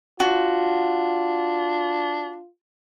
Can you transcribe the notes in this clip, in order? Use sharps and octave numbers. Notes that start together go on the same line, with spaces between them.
D4 F4 F#4